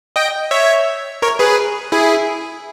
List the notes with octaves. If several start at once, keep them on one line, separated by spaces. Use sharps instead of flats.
D#5 G5
C#5 E5
A#4 C#5
G#4 B4
E4 G#4